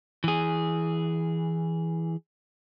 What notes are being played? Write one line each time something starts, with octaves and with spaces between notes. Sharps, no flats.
E3 G#4